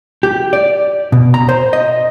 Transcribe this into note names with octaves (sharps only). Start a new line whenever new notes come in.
G4
D5
B2
A#5
C5
D#5